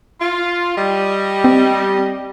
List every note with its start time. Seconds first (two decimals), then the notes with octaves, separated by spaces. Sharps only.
0.21 F4
0.77 G3 D#5
1.44 C4